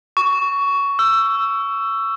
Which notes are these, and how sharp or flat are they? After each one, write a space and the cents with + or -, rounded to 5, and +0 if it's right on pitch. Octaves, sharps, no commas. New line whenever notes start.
C#6 +15
E6 +20